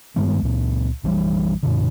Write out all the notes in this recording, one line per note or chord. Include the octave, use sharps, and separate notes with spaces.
G2 D#3 G#3 B3
C#2 A#2
A#1 E3 F3 G3
F#2 A#2 D3